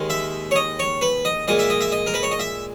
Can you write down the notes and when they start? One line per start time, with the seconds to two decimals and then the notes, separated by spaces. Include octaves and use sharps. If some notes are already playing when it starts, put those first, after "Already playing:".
Already playing: D#2 D#3 G#3
0.10 E5
0.51 C#5
0.56 D#5
0.79 C#5
1.01 B4
1.25 D#5
1.48 A#2 G#3 D#5
1.59 E5
1.70 D#5
1.81 E5
1.92 D#5
2.06 A#4
2.14 B4
2.23 C#5
2.31 D#5
2.39 E5